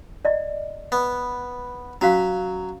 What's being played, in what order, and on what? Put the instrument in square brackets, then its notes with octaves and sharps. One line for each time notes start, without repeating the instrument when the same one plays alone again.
[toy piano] D5 D#5
[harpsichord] B3
[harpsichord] F#3 [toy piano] C#4 F#4 F5